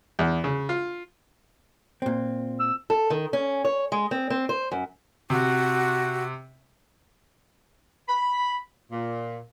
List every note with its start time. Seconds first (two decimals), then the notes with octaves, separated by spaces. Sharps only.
0.19 E2
0.44 C#3
0.69 F4
2.02 A#2 C4
2.60 E6
2.90 A4
3.10 D#3
3.33 C#4
3.65 C#5
3.92 G#3
4.11 C4
4.30 C4
4.49 C5
4.72 F#2
5.30 C3 F#4
8.08 B5
8.92 A#2